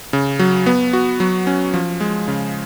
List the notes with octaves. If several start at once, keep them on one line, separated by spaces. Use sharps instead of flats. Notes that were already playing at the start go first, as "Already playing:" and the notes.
C#3
F#3
B3
F#4
F#3
C#4
F3
G#3
C#3